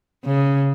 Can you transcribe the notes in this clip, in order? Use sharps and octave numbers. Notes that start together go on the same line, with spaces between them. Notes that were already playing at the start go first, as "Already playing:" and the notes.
C#3